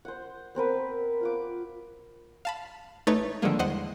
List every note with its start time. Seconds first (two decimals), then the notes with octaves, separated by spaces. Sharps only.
0.05 C5 F#5
0.55 B3 C4 A#4 B4
1.21 F4 B4 D6
2.45 F5 A5 B5
3.07 A1 A3 D#4 B4 C#5 A6
3.42 D3 D#3 F3 G3 G#3 A#3
3.59 E2 C5 D#5 F#5